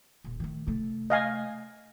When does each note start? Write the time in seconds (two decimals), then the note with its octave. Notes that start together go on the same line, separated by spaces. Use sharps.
0.24 D#1
0.40 D#3 A3
0.67 C3 A3
1.10 D#5 F5 G#5